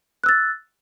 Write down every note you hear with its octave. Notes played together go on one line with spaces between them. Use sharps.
E6 F#6 A6